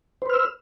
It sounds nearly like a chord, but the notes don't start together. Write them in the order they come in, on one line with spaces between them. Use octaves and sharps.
C5 B4 F6 E6